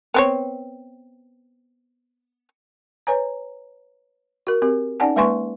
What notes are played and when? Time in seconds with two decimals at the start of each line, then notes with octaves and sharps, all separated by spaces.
0.14 B3 C4 C#5
3.07 B4 C#5 G#5 A#5
4.47 F#4 A#4
4.62 C4 G4 A#4
5.00 C#4 D#4 D5 F#5 G#5 A5
5.16 G#3 A#3 B4 G#5 C6 C#6